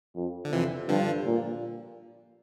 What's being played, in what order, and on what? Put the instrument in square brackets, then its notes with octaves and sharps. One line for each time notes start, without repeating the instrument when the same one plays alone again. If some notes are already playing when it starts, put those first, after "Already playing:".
[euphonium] F2
[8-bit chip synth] D3
[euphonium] F2 [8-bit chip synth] C3 E3
[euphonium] G2 [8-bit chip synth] D3 F3
[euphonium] A#2